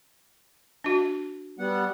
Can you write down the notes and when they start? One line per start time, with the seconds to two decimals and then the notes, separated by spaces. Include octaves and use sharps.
0.84 D4 F#4
1.59 G3 B3 F#5